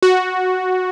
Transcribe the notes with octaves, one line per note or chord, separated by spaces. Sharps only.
F#4